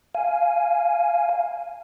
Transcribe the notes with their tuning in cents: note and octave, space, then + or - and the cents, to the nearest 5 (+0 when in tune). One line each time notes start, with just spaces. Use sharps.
F5 -15 G#5 +0